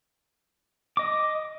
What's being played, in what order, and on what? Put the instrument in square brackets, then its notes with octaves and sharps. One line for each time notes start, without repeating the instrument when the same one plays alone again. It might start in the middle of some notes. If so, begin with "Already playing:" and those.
[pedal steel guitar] D#5 D6